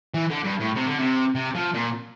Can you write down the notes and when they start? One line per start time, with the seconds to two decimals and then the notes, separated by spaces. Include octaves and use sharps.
0.14 E3
0.30 D3
0.44 G2
0.60 A2
0.75 C3
0.87 D3
0.98 C3
1.35 C3
1.55 F3
1.74 A#2